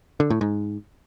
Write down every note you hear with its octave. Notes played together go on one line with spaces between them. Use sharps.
D3
A2
G#2